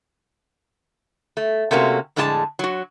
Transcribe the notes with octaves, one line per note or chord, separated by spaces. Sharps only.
A3
C3 A3 A#3 C#4 F#4
F2 A2 D3 G#3 D4 A5
F#3 F#4